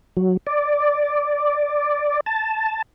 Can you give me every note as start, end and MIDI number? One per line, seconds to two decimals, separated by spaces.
0.17 0.37 54
0.47 2.20 74
2.26 2.82 81